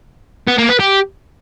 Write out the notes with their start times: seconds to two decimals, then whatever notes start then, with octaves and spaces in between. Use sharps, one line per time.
0.48 B3
0.58 A#3
0.69 B4
0.80 G4